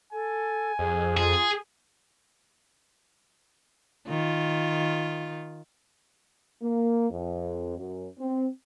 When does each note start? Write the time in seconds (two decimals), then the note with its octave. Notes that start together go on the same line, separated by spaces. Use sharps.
0.12 A4 G#5
0.79 F2 G#4
1.17 F4 G#4
4.09 D#3 F4
6.63 A#3
7.10 F2
7.78 F#2
8.19 C4